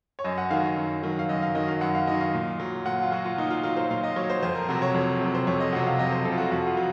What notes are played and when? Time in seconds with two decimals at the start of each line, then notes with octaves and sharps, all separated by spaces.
0.19 C#5
0.24 F#2 D#5
0.38 F#5
0.50 D#3 F#3 F5
0.64 F5
0.77 F#2
1.03 D#3 F#3
1.19 F5
1.29 F#2 D#5
1.42 F5
1.55 D#3 F#3 D#5
1.68 F5
1.81 F#2 F#5
1.95 F5
2.07 D#3 F#3 D#5
2.21 F5
2.33 A#2
2.60 F#3
2.85 A#2 F#5
3.03 F4
3.12 F#3 F#4
3.25 F4
3.37 A#2 D#4
3.50 F4
3.63 F#3 F4
3.76 C5
3.90 A#2 F5
4.04 D#5
4.16 F#3 C#5
4.30 C5
4.42 F2 C5
4.55 A#4
4.68 C3 F#3 F#4
4.82 C#5
4.94 F2
5.21 C3 F#3
5.35 C5
5.47 F2 C#5
5.60 D#5
5.73 C3 F#3 F#5
5.87 F5
5.99 F2 D#5
6.12 C5
6.25 C3 F#3 A4
6.32 F4
6.38 F#4
6.51 F2 F#4
6.67 F4
6.77 F#3